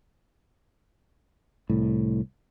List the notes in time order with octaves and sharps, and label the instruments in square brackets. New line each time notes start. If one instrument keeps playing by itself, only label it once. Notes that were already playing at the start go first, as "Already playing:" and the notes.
[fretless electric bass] C2 A2